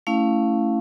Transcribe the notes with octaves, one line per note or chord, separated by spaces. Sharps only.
A3 C#4 E4 F5